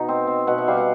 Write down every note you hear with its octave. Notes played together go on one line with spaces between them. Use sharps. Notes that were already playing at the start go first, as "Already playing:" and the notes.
Already playing: B2 D#4
C4
C4
B2 F#5
E5
G3 F5
F#5